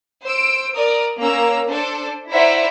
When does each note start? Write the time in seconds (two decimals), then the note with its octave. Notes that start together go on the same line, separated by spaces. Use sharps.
0.25 C5 E6 D7
0.76 A#4 D5 D#6
1.19 A#3 C#4 A#5 E6
1.67 D4 A4 C5
2.31 E4 C5 D5 E5 F#5 A#5